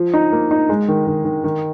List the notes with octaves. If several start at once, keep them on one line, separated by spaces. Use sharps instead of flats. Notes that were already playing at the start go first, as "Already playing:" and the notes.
Already playing: F3
D#4
A#3
D#4
G#3
D#3
D#3
D#3
D#3